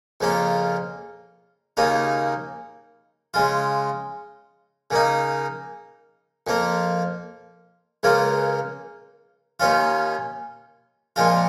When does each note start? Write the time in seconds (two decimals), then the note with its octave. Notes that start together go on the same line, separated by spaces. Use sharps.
0.21 F2 C#3 A#3 F4
1.77 D#2 C#3 A#3 D#4
3.34 C#3 G#3 F4
4.91 C#3 A#3 D#4
6.47 F2 F3 A#3
8.03 C#2 C#3 A#3 F4
9.60 D#2 D#3 C#4 F4
11.16 A#2 F3 G#3 F4